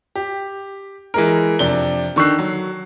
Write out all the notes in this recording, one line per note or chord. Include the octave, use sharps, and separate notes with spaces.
G4
E3 G#3 A#4
F2 C3 D4 G7
D3 D#3 C#6 E6 F#6 C7
F#3